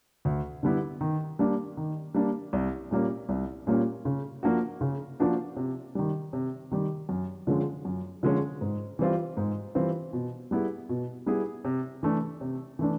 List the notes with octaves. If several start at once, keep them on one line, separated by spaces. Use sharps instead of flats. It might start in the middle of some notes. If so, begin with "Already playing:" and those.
D2
D3 G3 B3 E4
D#3
G3 A#3 D4
D#3
G3 A#3 D4
C2
A#2 G3 A#3 C#4
C2
A#2 G3 A#3 C#4
C#3
F3 A#3 D4 F#4
C#3
F3 A#3 D4 F#4
C3
D#3 G3
C3
D#3 G3
F#2
D3 F3 G#3 C#4
F#2
D3 F3 G#3 C#4
G#2
E3 G3 C4 F4
G#2
E3 G3 C4 F4
B2
G3 B3 E4 G#4
B2
G3 B3 E4 G#4
C3
E3 A3 D4
C3
E3 A3 D4